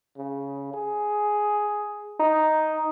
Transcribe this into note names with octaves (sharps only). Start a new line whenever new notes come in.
C#3
G#4
D#4